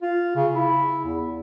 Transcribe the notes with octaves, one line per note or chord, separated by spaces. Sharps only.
F4
C#3
E4
E2